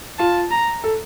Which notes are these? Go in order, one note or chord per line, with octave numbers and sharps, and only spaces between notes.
F4 A5
A#5
A4